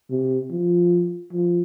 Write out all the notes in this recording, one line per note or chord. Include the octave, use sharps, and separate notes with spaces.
C3
F3
F3